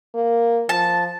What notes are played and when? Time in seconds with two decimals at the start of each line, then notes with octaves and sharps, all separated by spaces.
0.14 A#3
0.69 F3 A5